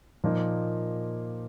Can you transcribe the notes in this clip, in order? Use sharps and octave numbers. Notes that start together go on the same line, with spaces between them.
A#2 F3 A#3 D#4